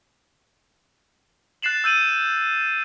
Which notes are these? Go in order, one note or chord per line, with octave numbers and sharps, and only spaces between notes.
F#6 A6 C7 E7 F#7
E6 G6 D#7 F#7